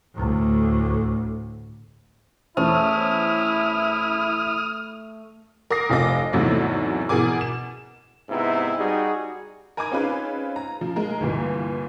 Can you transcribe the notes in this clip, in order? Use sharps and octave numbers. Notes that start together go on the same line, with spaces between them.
D2 A2
E2 A3 C#4 E4 C5 D#6 F6
A#4 D6 D#6 A#6 C7
F1 C3 F4 D#5 D6 A#6
E2 G#2 C3 F#3 A3
B2 E3 G#4 A#4 G#5 D6
E7
G#2 C3 B3 D#4 E4
G3 D#4 F#4 G#4
A#4 G#5 A#5 B5 D6 G#6
C4 C#4 D#4 F4 G#4 B4
A#5
F3
G#3 A#4
G1 C2 A#2 E3